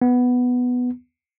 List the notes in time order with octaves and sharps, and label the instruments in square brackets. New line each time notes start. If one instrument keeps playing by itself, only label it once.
[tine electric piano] B3